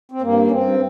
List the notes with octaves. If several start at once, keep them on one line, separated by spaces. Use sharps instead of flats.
C4
G2 A#3
C#4
G2 C4